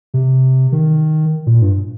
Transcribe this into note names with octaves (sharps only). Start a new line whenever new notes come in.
C3
D#3
A#2
G2